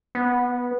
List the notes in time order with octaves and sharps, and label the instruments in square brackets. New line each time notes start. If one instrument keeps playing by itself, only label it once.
[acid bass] B3